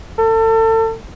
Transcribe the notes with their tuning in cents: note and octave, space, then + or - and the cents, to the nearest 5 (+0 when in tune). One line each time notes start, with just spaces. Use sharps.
A4 +35